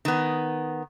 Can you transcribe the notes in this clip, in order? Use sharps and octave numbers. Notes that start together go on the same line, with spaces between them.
D#3 B3